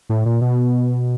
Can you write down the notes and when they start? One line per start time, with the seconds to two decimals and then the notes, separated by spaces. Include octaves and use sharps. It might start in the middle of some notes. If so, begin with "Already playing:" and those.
0.09 A2
0.26 A#2
0.41 B2